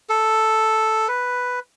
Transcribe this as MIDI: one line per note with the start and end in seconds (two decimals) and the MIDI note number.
0.10 1.08 69
1.08 1.59 71